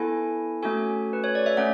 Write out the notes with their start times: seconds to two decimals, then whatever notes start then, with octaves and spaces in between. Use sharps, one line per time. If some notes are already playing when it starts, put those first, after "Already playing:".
Already playing: B3 E4 A4 G#5
0.63 A3 C#4 F#4 A4 G#5
1.13 B4
1.24 C#5
1.35 D5
1.46 E5
1.57 A3 C#4 F#5